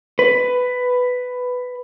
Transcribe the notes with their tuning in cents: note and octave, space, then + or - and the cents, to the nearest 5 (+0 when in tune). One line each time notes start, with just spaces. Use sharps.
B4 +10